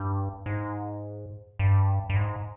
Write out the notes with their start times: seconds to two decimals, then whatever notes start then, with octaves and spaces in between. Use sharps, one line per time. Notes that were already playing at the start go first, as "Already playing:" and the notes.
Already playing: G2
0.46 G#2
1.59 G2
2.10 G2
2.16 G#2